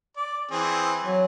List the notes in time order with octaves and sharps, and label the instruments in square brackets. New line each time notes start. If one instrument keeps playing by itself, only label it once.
[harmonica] D5
E3 C4 G#4
[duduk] F#3